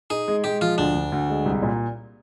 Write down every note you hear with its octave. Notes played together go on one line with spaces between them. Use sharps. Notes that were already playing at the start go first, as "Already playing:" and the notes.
D#4 G#4
G#3
G#3 G4
F3 F4
D2 D4
D2
D2
G#3
C2
A#2